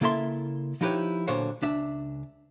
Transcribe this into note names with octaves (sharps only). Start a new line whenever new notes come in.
C#3 A#3 E4 A4 E5 C6
F3 D#4 E4 G4 B4 C#5
B1 A#2 D3 C5 C#5 F5
C#2 D4 E5